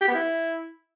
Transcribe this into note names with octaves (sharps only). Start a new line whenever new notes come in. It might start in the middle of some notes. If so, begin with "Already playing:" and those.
G4
B3
E4